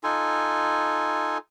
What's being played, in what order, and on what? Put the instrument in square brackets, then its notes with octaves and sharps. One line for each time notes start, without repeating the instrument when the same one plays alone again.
[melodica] D#4 F4 A4 G#5